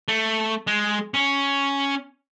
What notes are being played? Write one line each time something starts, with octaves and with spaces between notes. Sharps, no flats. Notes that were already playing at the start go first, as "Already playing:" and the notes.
A3
G#3
C#4